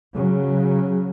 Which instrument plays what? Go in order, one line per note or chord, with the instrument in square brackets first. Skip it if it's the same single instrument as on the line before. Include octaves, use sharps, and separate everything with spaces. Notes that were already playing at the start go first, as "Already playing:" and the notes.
[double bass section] C#3 F#3